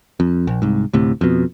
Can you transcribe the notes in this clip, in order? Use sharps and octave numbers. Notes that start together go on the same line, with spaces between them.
F2
A#1
C2 G#2
D2 A2 C3
F2 B2